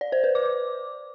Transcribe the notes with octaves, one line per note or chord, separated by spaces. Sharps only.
D5
C5
B4
D6